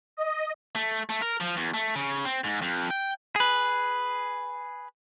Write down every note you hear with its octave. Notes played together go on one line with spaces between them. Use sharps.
D#5
A3
A3
A#4
F3
E2
A3
C#3
C4
G#2
F2
G5
G#4 B4